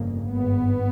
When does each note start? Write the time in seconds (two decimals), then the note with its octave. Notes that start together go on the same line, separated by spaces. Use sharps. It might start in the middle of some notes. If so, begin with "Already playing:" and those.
Already playing: G1 F2 C#3 A#3
0.30 G#1 G2 B3